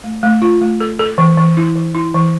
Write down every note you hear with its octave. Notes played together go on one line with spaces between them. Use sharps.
A3
A3
F4
A3
A4
A4
E3
E3
E4
E3
E4
E3